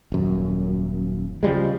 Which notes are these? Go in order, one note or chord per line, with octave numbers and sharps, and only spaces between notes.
D#1 F#2
C#3 F3 G3 G#3